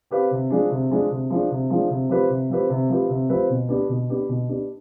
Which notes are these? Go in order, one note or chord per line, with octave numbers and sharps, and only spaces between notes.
C4 G4 B4 F5
C3
F3 G#3 D4
C3
F3 G#3 D4
C3
F3 G#3 D4
C3
F3 G#3 D4
C3
F3 C4 G4 B4
C3
F3 C4 G4 B4
C3
F3 C4 G4 B4
C3
F3 C4 G4 B4
B2
B3 D4 G4
B2
B3 D4 G4
B2
B3 D4 G4